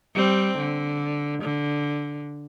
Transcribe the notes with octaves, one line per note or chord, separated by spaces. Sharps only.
G3 C4
D3
D3